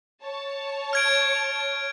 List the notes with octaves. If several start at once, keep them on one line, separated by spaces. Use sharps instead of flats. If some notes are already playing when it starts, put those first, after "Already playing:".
C#5 A5
F6 G#6 D7